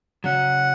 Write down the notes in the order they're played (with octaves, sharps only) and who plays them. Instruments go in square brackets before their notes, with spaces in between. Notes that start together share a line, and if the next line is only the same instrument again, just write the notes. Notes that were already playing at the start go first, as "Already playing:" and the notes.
[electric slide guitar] C#3 F#3 C#4 [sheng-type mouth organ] F#5